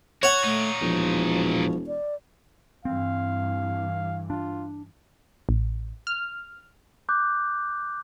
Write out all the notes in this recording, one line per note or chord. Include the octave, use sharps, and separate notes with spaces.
F#4 C#5 F#5
A#2 A3 D#4
E1 F3
D5
G2 E3 C4 F5
D4 F4
A1
F6
D6 F#6 G6